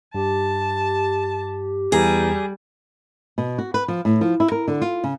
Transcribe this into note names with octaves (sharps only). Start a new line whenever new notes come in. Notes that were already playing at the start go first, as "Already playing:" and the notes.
G2 G4 A5
E2 E3 G3 G#4 A#5
B2
F#4
B4
F3
A2
F3
E4
A#4
D3
F4
C#3